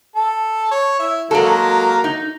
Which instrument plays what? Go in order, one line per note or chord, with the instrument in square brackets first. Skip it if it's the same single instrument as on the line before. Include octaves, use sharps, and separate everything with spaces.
[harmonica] A4
C#5
E4 E5
[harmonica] F#3 A#3 A#4 [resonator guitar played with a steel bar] G#3 A4
[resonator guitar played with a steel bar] D#4